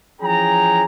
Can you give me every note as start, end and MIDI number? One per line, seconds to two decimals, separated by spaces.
0.21 0.84 52
0.21 0.84 53
0.21 0.84 61
0.21 0.84 68
0.21 0.84 79
0.21 0.84 82